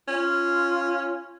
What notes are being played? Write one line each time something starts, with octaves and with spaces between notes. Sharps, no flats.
C#4 F4